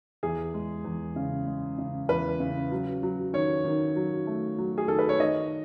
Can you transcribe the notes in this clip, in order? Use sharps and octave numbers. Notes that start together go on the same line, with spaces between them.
E2 G#4
G#3
E2
C#3
G#3
C#3
E2 B4
C#3
F#3
F#3
D#3 C#5
D#3
F#3
A3
F#3
G#4
D#3 A4
B4
C#5
D#3 D#5